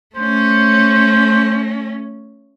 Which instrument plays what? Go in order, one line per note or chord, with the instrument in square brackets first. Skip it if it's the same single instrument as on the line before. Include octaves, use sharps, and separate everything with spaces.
[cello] A3 C#4 [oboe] C5